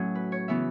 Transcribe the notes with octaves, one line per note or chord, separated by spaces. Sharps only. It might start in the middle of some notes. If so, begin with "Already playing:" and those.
Already playing: A2 F#3 C#4
B4
C#5
C#3 E3 B3 E5